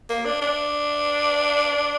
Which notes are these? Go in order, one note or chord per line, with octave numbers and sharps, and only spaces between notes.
A#3
D4
D4